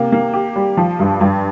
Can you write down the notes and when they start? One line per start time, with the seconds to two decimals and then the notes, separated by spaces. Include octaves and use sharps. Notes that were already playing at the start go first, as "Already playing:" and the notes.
Already playing: C3 A#3
0.12 A#3
0.33 G4
0.56 G3
0.77 F3
0.99 G2
1.20 G2